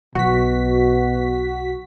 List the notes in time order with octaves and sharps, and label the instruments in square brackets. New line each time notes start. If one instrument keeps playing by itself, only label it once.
[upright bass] B1 [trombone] B2 [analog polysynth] F#4 B6